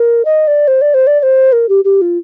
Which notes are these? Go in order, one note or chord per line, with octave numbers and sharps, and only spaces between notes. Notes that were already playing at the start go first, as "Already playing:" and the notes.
Already playing: A#4
D#5
D5
C5
D5
C5
D5
D5
C5
A#4
G4
G4
F4